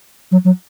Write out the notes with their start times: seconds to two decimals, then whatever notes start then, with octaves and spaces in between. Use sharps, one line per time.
0.32 F#3
0.45 F#3